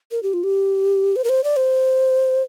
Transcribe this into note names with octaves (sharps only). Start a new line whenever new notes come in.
A#4
G4
F4
G4
C5
A#4
C5
D5
C5